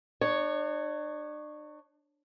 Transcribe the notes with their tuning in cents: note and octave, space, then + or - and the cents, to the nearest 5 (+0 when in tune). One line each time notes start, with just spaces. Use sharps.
D4 +40 C#5 +0